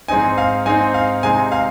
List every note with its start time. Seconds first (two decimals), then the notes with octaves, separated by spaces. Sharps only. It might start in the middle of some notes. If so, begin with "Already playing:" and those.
0.08 G#2 G#3 C4 D#4 G#5
0.38 F5
0.66 G#2 G#3 C4 D#4 G#5
0.94 F5
1.23 C3 G#3 C4 D#4 G#5
1.52 F5